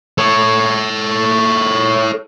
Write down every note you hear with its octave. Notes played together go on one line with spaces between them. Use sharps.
A4 C#5